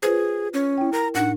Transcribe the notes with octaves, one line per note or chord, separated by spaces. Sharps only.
F4 G#4 B4 C5
C#4
E4 G5
A#4 A#5
A2 D4 D#4 F#5